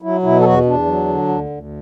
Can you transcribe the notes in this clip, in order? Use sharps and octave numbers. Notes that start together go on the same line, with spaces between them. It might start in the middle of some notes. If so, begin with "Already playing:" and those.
F#3 E4
B2 E4
A4
E2 F#4
E2 D4
F#3
D3
D2
D2